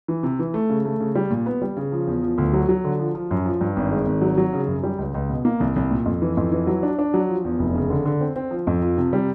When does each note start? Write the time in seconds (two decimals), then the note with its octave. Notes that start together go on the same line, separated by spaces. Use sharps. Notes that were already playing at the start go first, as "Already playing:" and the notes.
0.08 E3
0.23 C3
0.39 E3
0.54 A3
0.70 C#3
0.85 A3
1.00 C#3
1.15 G3
1.30 A#2
1.46 B3
1.62 G3
1.77 C#3
1.92 F3
2.07 E2
2.23 F3
2.38 D2
2.53 F#3
2.69 F#3
2.84 D3
2.99 F3
3.15 F3
3.31 F#2
3.46 F3
3.61 G2
3.76 G#1
3.91 G#3
4.06 G#1
4.22 F#3
4.38 F#3
4.53 C#3
4.68 F#2
4.83 G3
4.98 C#2
5.14 C#2
5.30 B2
5.45 A#3
5.60 C2
5.76 C2
5.91 A#2
6.06 F2
6.22 E3
6.37 F2
6.52 E3
6.67 F#3
6.83 D4
6.99 D4
7.14 F#3
7.29 F3
7.44 E2
7.59 F1
7.75 C#3
7.90 D3
8.05 D3
8.21 C4
8.36 C4
8.51 F3
8.67 F2
8.82 F3
8.97 C3
9.13 G3